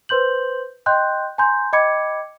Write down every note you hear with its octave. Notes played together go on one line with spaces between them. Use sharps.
B4 C5 C6 G6 F#7
D#5 G5 C6 F#6 G6
G#5 A#5 C6 G6
D#5 G5 B5 D6 G#6 C#7